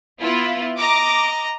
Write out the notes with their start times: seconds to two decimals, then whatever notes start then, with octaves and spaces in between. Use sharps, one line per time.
0.20 B3 E4 F4
0.78 D#5 A#5 D6